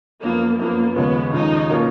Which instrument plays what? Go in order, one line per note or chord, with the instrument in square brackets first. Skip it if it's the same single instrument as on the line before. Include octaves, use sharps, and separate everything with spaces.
[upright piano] F#2 F3 B3 [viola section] A#3
[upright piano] F#2 F3 B3 [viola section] A#3
[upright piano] D#2 C#3 F3 G#3 C#4 [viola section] B3
[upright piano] D#2 C#3 F3 G#3 C#4 [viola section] D#4
[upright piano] B2 A#3 C#4 F4